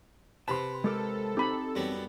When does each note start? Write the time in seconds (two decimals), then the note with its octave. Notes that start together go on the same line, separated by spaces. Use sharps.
0.48 C3 B4 A5 C6
0.84 G#3 G4 A4 A#4
1.37 C4 D#4 G4 B5
1.75 F#2 G3 B3